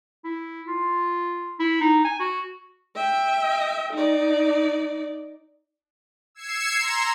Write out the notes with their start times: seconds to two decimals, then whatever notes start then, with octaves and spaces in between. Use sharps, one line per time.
0.24 E4
0.68 F4
1.60 E4
1.81 D#4
2.05 G#5
2.20 F#4
2.95 E5 G5
3.93 D#4 D5
6.35 E6 G#6 C7 C#7 E7
6.79 A#5 C6